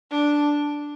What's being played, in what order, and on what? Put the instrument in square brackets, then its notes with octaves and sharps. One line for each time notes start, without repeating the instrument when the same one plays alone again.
[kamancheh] D4